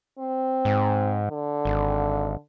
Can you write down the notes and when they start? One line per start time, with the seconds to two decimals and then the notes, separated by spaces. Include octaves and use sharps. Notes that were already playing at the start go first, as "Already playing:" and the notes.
0.19 C4
0.65 G#2
1.31 D3
1.65 G#1